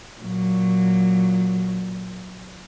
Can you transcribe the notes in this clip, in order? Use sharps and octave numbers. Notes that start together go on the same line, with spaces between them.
A#2 F#3